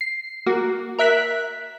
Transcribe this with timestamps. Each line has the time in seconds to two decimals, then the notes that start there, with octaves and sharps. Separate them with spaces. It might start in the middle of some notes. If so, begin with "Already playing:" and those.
0.01 C7
0.46 A#3 F#4
0.99 A#4 E5 F#6 B6